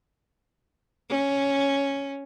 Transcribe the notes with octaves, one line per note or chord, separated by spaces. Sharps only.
C#4